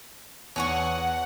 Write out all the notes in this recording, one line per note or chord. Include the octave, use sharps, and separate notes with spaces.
E2 C#5 F#5 G#5 C#6